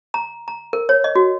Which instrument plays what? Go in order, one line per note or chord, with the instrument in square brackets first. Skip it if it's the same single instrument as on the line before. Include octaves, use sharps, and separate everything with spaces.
[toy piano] A#5
A#5
A#4
C#5
D#5
F#4